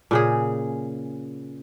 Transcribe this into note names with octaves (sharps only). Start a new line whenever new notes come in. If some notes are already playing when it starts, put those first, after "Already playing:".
A#2 C#3 G#4